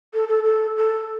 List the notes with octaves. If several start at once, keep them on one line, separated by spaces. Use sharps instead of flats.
A4
A4
A4
A4